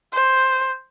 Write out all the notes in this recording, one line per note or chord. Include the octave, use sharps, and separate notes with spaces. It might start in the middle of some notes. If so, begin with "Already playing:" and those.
C5